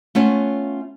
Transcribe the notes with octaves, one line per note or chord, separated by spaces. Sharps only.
A3 B3 C#4 F4 C#5 F#5